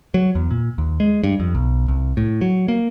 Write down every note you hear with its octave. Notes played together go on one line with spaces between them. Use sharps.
F#3
E2
A#2
D#2
G#3
G2
F2
B1
C2
A2
F#3
A#3